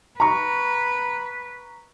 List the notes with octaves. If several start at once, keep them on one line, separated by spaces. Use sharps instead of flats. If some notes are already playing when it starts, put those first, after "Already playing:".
B4 A#5 C#6